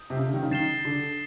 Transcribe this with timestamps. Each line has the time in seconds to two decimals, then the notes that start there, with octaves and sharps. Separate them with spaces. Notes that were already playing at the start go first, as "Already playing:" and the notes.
Already playing: D#6 G6
0.10 C3
0.17 C#3
0.26 D3
0.34 D#3
0.43 C#3
0.51 D#3 A6 C7 E7 G7
0.85 D3